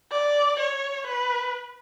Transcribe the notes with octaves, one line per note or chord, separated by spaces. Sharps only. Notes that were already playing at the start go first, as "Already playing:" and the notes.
D5
C#5
B4